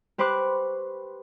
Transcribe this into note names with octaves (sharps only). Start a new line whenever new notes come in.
G4 B4 C5 C#6 D6 F#6